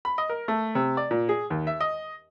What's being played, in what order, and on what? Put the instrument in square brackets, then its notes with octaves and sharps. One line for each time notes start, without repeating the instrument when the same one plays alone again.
[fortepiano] B5
D#5
A#4
A3
C3
D5
A#2
G#4
D#2
E5
D#5